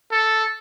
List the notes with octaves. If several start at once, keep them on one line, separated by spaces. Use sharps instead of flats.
A4